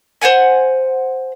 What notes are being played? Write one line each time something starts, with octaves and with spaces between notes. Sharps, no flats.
C5 C#5 F#5 G#5